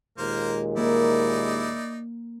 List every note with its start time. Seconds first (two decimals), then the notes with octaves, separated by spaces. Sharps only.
0.18 D#2 A#2 G#3 A#3 A#4 C5
0.77 A#3 D#4 E4 D5